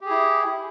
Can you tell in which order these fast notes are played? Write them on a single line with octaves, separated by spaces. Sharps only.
G4 G#4 E4